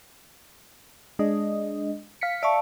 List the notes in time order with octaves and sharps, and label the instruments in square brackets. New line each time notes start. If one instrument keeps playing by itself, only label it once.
[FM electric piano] G#3 D4 D#5
F5 B6 C#7
[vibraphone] D5 F5 A5 [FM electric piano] E5 C#6